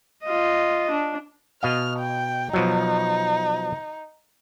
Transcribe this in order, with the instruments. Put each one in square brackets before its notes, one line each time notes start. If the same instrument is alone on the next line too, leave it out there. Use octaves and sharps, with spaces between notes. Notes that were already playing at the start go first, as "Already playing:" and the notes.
[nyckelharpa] F4 D#5
D4
[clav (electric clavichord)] B2 D#5 F5 [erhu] F6
[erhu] G5
[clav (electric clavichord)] B2 F3 F#3 [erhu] D#4